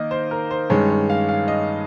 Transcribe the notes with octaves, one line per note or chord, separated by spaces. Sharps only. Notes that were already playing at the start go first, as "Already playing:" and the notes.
Already playing: D#3 A#3 D#4 D#5
C5
A#4
C5
G2 D#3 G#3 C#4 C#5
C#5
F5
F5
D#5